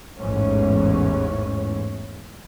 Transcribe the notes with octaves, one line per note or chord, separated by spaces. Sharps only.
A1 E2 G#2 E3 C#4